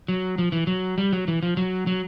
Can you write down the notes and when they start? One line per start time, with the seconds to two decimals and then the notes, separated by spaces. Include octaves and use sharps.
0.08 F#3
0.38 F3
0.52 E3
0.67 F#3
0.98 G3
1.13 F#3
1.28 E3
1.43 F3
1.57 F#3
1.87 F#3